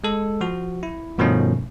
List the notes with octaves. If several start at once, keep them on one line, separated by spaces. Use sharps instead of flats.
G#3 A4
F3 F#4
E4
G2 B2 D#3 F3 A3 C#4